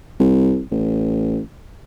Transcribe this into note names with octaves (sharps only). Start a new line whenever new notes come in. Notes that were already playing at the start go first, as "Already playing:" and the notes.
C2
A1